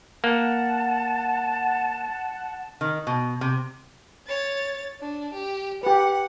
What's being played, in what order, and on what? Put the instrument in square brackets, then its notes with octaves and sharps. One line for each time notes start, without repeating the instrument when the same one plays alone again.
[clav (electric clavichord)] A#3 [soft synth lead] F#5 [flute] A5
[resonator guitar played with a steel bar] D#3
B2
C3
[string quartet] C#5 A6
D4
G4
[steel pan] G4 B4 [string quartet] F#5